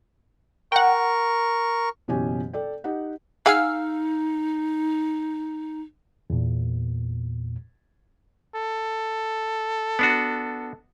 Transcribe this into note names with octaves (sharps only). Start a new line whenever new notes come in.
A#4 F#5 G5 C#6
F#1 B2 E3 C#4 G4 G#5
A4 D5 G5
D#4 G4 F#5
D#4 G#4 F5 F#5 G#5 E6 F6
E2 A#2
A4
B3 D4 F#4